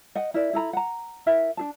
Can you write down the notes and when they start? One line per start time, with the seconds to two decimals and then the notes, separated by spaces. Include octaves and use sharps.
0.15 D#5 F#5 G5
0.34 E4 A#4 D5 E5
0.53 E4 A4 A#5 B5
0.73 F#5 A#5
1.26 E4 A#4 E5
1.57 D4 G#4 A5